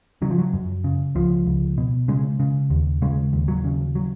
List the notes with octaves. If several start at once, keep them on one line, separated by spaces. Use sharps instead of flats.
C#3 F#3
F3
F#3
F#2
C#3
C#2 F3
C#2
B2
C#3 G#3
C#3
D#2
C#3 G#3
D#2
F#3
C#3
F#3